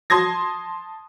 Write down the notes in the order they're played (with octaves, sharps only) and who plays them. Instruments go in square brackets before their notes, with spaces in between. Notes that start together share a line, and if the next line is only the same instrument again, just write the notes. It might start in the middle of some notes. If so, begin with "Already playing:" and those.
[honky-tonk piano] A5 C6 D#6 G#6 A#6